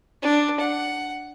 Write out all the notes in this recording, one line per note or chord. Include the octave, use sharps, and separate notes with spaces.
D4
F#5